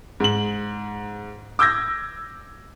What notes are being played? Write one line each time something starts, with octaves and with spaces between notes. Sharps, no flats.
G#2 F#7
D6 E6 G6 G#6 A#6